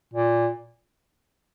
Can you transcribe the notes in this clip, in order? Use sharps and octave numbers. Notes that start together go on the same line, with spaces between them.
A#2